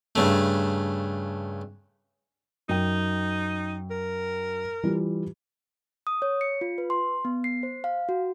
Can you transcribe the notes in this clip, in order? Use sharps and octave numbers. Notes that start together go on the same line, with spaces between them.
G2 C#3 A3
F#2 D#4 G5
A#4
E3 G3 F4
D#6
C#5
C#7
F4
B4
C6
B3
C7
C5
F5
F#4